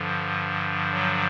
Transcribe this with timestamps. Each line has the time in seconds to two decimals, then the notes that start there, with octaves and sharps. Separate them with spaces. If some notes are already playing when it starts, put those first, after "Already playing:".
Already playing: G2 D3 F3
0.93 F#3